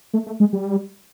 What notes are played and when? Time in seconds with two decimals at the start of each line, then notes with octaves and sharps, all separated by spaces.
0.14 A3
0.26 A3
0.40 G#3
0.53 G3